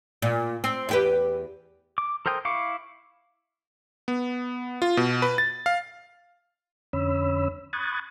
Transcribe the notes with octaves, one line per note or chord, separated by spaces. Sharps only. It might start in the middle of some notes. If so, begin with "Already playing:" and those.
A#2
C4
E2 G4 B4
D6
A4 A#4 C5 G5 D#6
E4 F5 C#6 D6
B3
F4
B2
B4
A6
F5
F2 D3 C#4 C#5 B5 E6
B5 C#6 D#6 F#6 G#6 A6